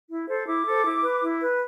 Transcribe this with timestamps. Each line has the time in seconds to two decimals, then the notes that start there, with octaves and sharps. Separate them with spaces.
0.09 E4
0.28 A4 C5
0.46 E4 D6
0.66 A4 C5
0.85 E4
1.03 B4
1.23 E4
1.42 B4